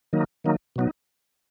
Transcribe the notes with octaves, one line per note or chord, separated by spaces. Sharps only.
D#3 F#3 A#3 D#4
D#3 F#3 A#3 D#4
B2 F#3 B3 D#4